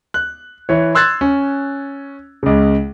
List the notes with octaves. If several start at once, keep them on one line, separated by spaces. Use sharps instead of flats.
F#6
E3 C#5
C6 E6 F#6 G#6 A6
C#4
C#2 C#3